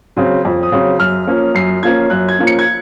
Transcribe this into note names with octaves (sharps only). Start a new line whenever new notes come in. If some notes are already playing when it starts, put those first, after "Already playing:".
C#3 F#3 C4
F2
D#6
C#3 F#3 C4
F#2 F6
F3 A#3 C#4
F#2 C7
F3 A#3 C#4 G#6
F#2 F#6
G#6
F3 A#3 C#4
C#7
G#6